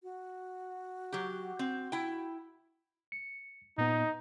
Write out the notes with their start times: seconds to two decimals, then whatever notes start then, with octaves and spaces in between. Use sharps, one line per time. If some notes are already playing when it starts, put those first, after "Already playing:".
0.03 F#4
1.13 F#3 G4
1.59 C4
1.92 E4 G5
3.12 C#7
3.78 A#2 B3 D#4